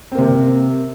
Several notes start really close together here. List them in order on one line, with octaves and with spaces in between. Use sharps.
C4 A#3 C3